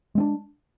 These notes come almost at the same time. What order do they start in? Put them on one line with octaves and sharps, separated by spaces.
G#3 C4 D4